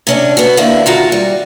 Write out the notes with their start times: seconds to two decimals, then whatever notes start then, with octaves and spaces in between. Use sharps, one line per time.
0.07 C3 C#4 D4
0.37 B3 F#4
0.57 D2 D3 A#3 E4
0.86 D#3 F4 F#4 A#5
1.12 G3